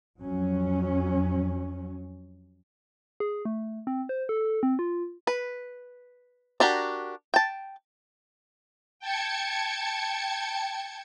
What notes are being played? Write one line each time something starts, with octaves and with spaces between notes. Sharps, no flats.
F2 F#3 C#4
G#4
A3
C4
C5
A4
C4
F4
B4
D4 F#4 G4 A#4
G5 A5
G5 A5 G#6 C#7